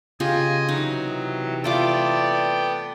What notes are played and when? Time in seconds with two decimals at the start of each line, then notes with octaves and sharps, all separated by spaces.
0.20 C#3 F4 G4 D#5 G#5
0.69 C3 E3 F#3 D#4
1.64 A3 B3 F4 A4 D5 G5 D6